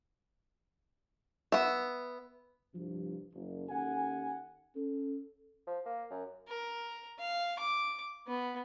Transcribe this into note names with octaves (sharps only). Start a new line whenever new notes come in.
B3 E5
C2 G2 F3
F#1
D#2 C#4 A4 F#5 G#5
C#4 A4
F3
A#3
F#2
A#4
F5
D6
B3